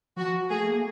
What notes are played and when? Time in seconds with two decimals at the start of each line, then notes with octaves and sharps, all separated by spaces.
0.17 F3 F#4
0.49 A3 G#4
0.66 A#3